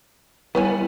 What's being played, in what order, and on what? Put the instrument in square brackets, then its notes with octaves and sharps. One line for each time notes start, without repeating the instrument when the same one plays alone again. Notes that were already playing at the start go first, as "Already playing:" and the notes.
[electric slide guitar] G3 B3 E4 [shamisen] B4 C#5 G#5